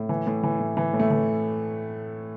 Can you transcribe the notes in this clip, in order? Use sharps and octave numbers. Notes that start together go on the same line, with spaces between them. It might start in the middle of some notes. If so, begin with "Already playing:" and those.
Already playing: A2
E3
A2
E3
A2
E3
A2
A3
E3